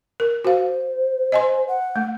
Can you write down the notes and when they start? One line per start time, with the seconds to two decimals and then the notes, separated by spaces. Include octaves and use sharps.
0.20 A#4
0.45 F#4 C5 F5
1.32 D#5 G#5 C6
1.68 F#5
1.96 A3